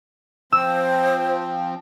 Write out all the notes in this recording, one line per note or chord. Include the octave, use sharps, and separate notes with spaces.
F3 C4 C5 E6